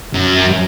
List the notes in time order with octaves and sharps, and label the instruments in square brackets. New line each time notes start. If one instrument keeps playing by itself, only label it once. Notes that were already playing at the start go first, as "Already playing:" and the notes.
[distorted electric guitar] F#2